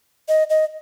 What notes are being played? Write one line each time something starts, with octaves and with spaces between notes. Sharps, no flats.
D#5
D#5